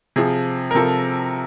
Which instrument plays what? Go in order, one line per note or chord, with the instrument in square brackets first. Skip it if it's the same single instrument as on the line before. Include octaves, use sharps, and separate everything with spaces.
[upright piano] C3 F3 G#4
A#4
C3 F3 A4